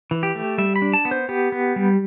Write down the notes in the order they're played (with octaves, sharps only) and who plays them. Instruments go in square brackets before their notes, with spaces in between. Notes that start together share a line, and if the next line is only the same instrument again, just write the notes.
[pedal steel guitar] E3
G4
A3
G3 E5
B5
D4
A5
B3
C5
B3 G4
B3
G3